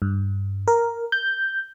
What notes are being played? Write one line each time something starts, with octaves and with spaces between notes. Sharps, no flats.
G2
A#4
G6